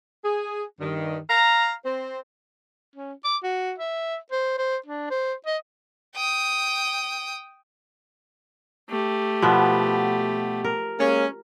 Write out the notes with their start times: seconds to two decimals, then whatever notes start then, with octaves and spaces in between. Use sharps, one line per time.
0.23 G#4
0.80 G2 D#3
1.29 F5 A#5
1.84 C4 C5
2.96 C#4
3.24 D6
3.43 F#4
3.78 E5
4.32 C5
4.58 C5
4.86 D4
5.11 C5
5.46 D#5
6.16 G5 D#6
8.90 A3 G4
9.42 B2 F3 B3
10.64 A#4
11.00 G#3 A#3 C#4